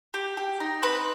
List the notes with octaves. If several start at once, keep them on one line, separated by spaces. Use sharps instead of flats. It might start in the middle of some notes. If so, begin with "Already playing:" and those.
G4
G4
D#4
C4 B4